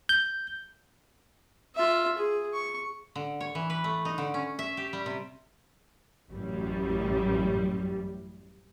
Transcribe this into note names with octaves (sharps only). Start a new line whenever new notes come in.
G6
F4 E5
G#4
C#6
D3
C#5
E3
B4
A3
D#4
D3
C#4
E5
G4
G3
C3
A1 F#2 G3